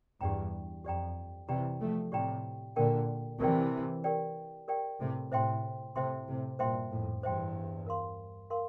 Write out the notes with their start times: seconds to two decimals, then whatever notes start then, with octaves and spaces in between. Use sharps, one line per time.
0.21 E2 G2 G4 D5 G5 A#5
0.84 F2 G4 D5 G5 A#5
1.48 C3 E3 G4 D5 G5 A#5
1.80 F3 A3
2.12 A2 C3 G4 D5 G5 A#5
2.76 A#2 D3 G4 A#4 D5 G5
3.40 C3 E3 G4 A#4 D5 G5
4.04 G4 A#4 D5 G5
4.68 G4 A#4 D5 G5
5.00 A2 C3
5.31 A2 C3 C5 E5 G5 C6
5.96 A2 C3 C5 E5 G5 C6
6.27 A2 C3
6.59 G2 A#2 C5 E5 G5 C6
6.91 F2 A2
7.23 E2 G2 C5 E5 G5 C6
7.86 A#4 F5 C6
8.50 A#4 F5 C6